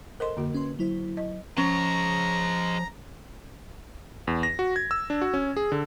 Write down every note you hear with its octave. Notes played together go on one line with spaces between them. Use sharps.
A4 A#4 C5 D#5 C6
F2 D3 A#3 F#4
C#4 B4 C6
F#3 E4 C5
D#5
F3 G#3 C#4 C#5 A#5
E2
A#6
F#4
G#6
E6
D4
F#4
C#4
G#4
D3